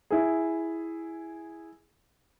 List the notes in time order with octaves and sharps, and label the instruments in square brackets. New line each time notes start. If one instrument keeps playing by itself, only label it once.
[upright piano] E4 G#4